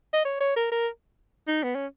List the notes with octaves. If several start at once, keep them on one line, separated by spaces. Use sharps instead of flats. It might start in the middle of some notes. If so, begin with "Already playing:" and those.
D#5
C#5
C#5
A#4
A#4
D#4
B3
C#4